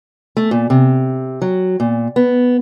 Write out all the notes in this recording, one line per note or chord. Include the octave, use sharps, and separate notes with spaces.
A3
A#2
C3
F#3
A#2
B3